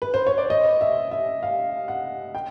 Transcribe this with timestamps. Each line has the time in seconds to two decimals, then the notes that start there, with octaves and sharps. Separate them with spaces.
0.02 B4
0.14 C5
0.27 C#5
0.38 D5
0.50 D#5
0.81 E5
1.11 E5
1.43 F5
1.88 F#5
2.35 G5